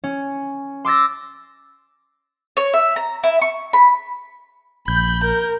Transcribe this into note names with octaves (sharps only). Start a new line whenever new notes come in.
C#4
C6 D6 E6 A6 A#6
C#5
E5
A#5
E4
C#6
B5
A#1 B5 G6
A#4